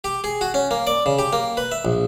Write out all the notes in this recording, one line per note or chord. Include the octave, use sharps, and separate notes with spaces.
G4
G#4
F#4
C#4
A#3
D5
C#3
G4
A#3
B4
E5
A#1